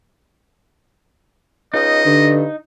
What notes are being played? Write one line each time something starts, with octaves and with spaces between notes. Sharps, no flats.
C#2 D#4 D#5
G2 D3